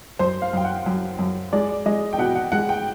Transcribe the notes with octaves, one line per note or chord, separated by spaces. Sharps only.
F#2 C5
F5
F#2 G5
F#5
F#2
F#2
G#3 D5
G#3 D#5
G5
B2 F#5
F#5
G#3 F#5
G5